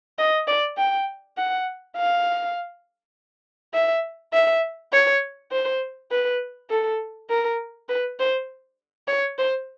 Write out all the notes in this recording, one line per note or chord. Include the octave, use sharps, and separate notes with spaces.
D#5
D5
G5
F#5
F5
E5
E5
C#5
C5
B4
A4
A#4
B4
C5
C#5
C5